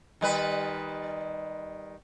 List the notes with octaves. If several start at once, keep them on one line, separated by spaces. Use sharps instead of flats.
D#3 G3 B4